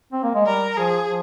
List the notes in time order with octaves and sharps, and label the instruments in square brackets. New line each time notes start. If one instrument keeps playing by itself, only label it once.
[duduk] C4
A#3
G#3
[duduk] G3 [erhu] A#4
[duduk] F3 [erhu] G#4
[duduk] F3